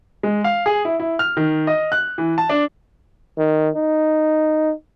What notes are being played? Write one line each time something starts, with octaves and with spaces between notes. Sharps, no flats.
G#3
F5
G#4
E4
E4
F6
D#3
D#5
F#6
E3
A5
D4
D#3
D#4